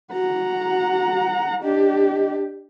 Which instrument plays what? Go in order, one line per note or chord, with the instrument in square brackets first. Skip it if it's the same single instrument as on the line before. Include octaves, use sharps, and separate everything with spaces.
[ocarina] F#4 [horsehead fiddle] F#5 A#5
[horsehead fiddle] D4 G4 [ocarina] D#5